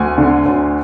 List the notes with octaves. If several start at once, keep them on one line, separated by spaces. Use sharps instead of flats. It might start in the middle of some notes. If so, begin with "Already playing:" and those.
Already playing: D2 G#5
D3
D2